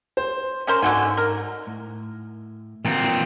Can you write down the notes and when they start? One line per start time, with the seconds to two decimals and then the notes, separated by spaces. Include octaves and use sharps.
0.17 C5
0.67 C#4 A#4 C5
0.82 G#2 D3 F#4 G#5
1.17 A#4
1.67 A2
2.85 A#2 E3 C4 F#5 G5